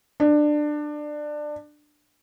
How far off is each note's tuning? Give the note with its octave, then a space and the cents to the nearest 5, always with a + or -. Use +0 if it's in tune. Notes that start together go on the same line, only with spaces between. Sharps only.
D4 +20